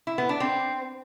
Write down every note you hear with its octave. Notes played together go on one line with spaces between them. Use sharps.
E4
B3
D4
C4